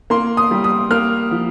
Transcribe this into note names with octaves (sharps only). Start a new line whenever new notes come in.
A#3 C6
D#6
G3
D#6
A#3 F6
F3